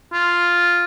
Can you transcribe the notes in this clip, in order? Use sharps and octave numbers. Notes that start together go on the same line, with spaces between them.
F4